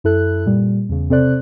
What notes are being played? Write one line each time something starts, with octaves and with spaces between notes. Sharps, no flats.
F#2 E4 A4 F#6
A#2 G3
E2 C#3
C3 C4 A4 C5 D5 F#6